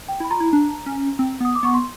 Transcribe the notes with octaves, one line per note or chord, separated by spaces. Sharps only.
G5
E4 B5
F4 A#5
E4
D4
C#4
C4
B3 D#6
D6
B3 C#6
C6